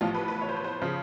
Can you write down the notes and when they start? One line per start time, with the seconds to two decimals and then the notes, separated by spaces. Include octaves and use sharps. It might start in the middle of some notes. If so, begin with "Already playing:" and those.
0.01 A1 A2 F3 F4
0.14 B4
0.28 B4
0.41 C#5
0.49 C5
0.57 B4
0.64 C5
0.81 C#3 F3